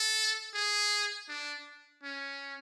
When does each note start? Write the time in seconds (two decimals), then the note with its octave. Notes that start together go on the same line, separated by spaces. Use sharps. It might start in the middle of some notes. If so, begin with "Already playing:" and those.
Already playing: A4
0.54 G#4
1.29 D4
2.03 C#4